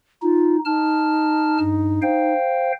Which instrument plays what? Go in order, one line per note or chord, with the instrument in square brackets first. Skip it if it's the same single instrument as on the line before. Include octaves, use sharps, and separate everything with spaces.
[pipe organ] D#4 [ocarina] F4
[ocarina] D#4 [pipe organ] A5 F6
[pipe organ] G2
C5 F5 G5